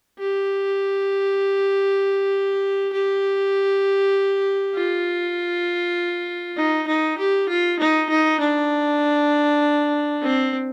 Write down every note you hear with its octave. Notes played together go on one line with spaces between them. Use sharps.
G4
G4
F4
D#4
D#4
G4
F4
D#4
D#4
D4
C4